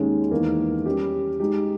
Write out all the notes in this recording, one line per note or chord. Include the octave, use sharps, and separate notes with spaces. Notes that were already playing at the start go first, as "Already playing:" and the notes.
Already playing: D#2 D#3 G#3 C#4 G#4
E2 D#3 A#3
G3 C#4 G4
G#3 D#4 G4